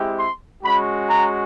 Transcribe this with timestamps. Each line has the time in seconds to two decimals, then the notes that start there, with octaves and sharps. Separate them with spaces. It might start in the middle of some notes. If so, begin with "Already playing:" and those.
Already playing: G#3 C4 E4 G4
0.18 C6
0.63 G#3 C#4 F#4 B5
1.09 A#5